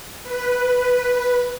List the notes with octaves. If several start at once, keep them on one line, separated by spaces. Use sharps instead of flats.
B4